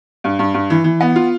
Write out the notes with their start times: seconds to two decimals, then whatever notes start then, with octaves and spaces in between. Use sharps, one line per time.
0.24 G2
0.39 G2
0.54 G2
0.70 E3
0.84 E3
1.01 B3
1.16 F4